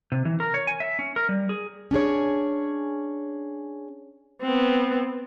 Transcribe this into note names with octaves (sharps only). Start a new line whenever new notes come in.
C3
E3
A#4
C#5
G#5
E5
C#4
A#4
G3
G#4
C#4 D4 G#4 C#5
B3 C4